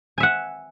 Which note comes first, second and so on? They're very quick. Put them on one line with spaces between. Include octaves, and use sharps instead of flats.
G#5 E5 F#5